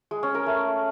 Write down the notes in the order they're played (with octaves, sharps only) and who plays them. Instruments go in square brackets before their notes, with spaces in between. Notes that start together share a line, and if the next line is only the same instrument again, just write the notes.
[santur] G#3
C#4
A#4
A3